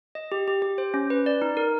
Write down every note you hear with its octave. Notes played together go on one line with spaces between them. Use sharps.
D#5
G4
G4
G4
C5
C#4
B4
D5
D#4
A#4